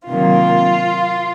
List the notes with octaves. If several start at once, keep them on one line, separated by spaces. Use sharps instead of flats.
C3 D#3 F#3 A#3 F4